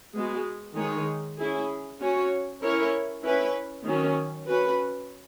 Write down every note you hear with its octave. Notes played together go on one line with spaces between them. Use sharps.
G#3 B3 F#4
D#3 G#3 D#4 G#4 C#5
C#4 E4 G#4
C#4 F#4 C#5
C#4 E4 A#4 C#5
C#4 E4 B4
D#3 F#3 C#4
C#4 F#4 B4